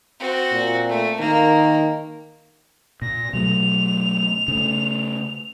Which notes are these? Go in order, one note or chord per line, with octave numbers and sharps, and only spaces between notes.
C4 F#4
A#2
A3
D#3 A#3
A#2 A#6
B2 F#3 A3 F7
C#3 A3